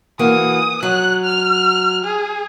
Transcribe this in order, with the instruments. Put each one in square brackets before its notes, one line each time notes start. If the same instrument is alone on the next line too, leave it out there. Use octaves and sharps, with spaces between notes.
[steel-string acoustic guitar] E3 A#3 F#4 [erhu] D#6
[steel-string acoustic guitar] F#3 [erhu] F#6
[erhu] F6
G#4